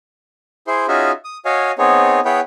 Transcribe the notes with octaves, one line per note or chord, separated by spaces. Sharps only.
E4 G#4 C5 C6
C#4 D#4 F4 F#4 G#4 E5
D#6
F#4 C#5 D#5 F5 G#5
B3 C4 D#4 G#4 C#5
B3 E4 G#4 B4 C#5 G5